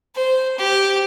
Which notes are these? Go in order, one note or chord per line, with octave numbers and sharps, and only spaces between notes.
C5
G4